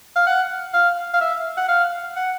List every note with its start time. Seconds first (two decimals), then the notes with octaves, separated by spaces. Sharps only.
0.16 F5
0.27 F#5
0.74 F5
1.14 F5
1.21 E5
1.57 F#5
1.69 F5
2.16 F#5